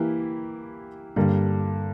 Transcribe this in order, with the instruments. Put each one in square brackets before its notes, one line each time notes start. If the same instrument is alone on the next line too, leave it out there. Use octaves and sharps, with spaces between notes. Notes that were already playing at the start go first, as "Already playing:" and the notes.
Already playing: [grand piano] E3 A#3 E4 G4
G2 D3 G3 A#3